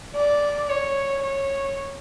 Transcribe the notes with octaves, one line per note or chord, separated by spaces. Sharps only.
D5
C#5
C#5